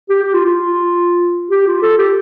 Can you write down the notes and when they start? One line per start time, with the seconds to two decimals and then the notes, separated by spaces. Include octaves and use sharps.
0.09 G4
0.22 G4
0.34 F4
0.45 F4
1.51 G4
1.67 F4
1.82 A4
1.98 G4